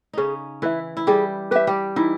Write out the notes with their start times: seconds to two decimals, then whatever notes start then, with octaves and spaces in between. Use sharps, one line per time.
0.13 C#3 C#4 D#4 G#4
0.62 E3 E4 B4 E5
0.97 E4
1.07 G3 G4 G#4
1.51 G4 B4 E5
1.67 G3 G4
1.96 E3 D#4 E4